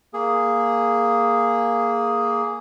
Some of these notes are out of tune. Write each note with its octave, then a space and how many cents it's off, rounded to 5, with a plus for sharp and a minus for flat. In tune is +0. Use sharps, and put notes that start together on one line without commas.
A#3 +0 G#4 +0